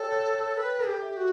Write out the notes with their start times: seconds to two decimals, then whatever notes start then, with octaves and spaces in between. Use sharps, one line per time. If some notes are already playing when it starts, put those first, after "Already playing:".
Already playing: A4 C#5 G5
0.12 C#5
0.34 C#5
0.57 B4 G5
0.79 A4
0.86 G4
1.02 E5
1.17 F#4